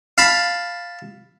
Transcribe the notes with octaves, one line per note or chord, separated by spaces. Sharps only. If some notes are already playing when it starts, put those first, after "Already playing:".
F5 A5 B5